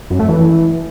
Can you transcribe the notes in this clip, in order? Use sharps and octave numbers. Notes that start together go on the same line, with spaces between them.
F#2
A3
E3